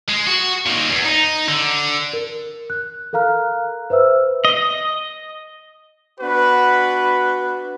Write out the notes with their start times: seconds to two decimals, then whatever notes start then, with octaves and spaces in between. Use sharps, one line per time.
0.09 G#3
0.27 F#4
0.66 A#2 D#4
0.90 E2
1.05 D#4
1.48 D3
2.13 A#4
2.70 F#6
3.13 A4 A#4 F5 A#5 F6 F#6
3.90 B4 C5 E5 E6 F6
4.45 D#5
6.20 B3 D4 F#4 B4